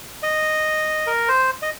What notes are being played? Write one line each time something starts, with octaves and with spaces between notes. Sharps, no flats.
D#5
A#4
C5
D#5